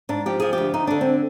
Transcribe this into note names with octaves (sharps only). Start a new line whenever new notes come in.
G#2 D4
F3 G4
F3 G#4
D2 G4
D2 D#4
D3 D4
C4